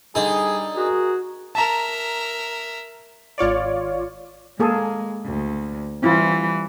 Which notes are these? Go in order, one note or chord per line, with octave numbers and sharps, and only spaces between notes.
D3 G3 D#4 G#4
F#4 G#4 A#4
A#4 E5 A5 A#5
G#1 F4 C#5 D5
G#3 A#3 G#4 A4
D2
E3 G3 C4 E4 F4